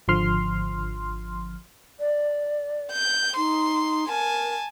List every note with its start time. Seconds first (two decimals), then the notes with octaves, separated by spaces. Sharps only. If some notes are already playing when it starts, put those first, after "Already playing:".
0.08 G#1 D3 F3 C6 F6
2.00 D5
2.92 G6
3.37 D#4 C6
4.08 A#4 G#5 A5